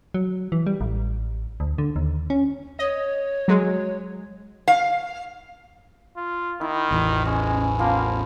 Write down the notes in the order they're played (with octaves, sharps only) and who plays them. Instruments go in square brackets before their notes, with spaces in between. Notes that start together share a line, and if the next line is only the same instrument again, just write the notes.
[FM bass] F#3
E3
G3
A1
D2
D3
D#2
C#4
[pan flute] C#5 [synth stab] D#5
[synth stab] F#3 G#3
[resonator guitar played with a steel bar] F5
[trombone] F4
[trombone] D#3 [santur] E4
[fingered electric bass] A1 E2
[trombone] G#3 [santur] C#4
[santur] F3 B3 [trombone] A#3